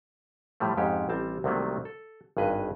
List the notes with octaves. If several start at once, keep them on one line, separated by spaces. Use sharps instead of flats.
A2 F3 G3 A3
F2 G#2 G#3 C#4 G4
A1 G3 C4 A5
C2 C3 D#3 F#3 A3 A#3
A4
G#1 G2 G#4 B4 D#5